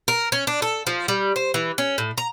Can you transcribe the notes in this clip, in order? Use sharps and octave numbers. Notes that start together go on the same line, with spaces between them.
A#4
C#4
D4
A4
F3
G3
C5
E3
C#4
A2
A#5